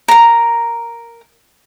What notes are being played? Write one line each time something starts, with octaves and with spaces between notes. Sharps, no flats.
A#4 A#5